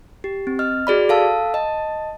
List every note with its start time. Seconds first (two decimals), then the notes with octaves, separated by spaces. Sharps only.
0.24 G4
0.47 C4
0.59 D#5 F6
0.87 F#4 G#4 D5 B5
1.09 A4 F5 A5 E6
1.54 D#5 A5